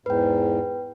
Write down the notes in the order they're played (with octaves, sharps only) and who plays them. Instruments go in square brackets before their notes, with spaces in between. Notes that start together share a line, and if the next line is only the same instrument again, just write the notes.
[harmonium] E2 G#2 [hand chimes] B4 G5